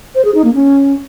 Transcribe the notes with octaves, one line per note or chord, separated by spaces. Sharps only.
C5
G#4
D#4
A#3
C#4